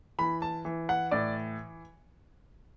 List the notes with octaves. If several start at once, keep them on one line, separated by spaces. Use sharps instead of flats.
E3 B5
A5
E3
F#5
A2 D5